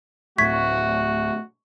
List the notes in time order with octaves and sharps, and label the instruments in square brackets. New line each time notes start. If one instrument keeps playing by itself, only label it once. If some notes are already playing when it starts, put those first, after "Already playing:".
[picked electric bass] D1 A2 [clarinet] A3 [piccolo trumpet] F#4 [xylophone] C#6 G#6 B6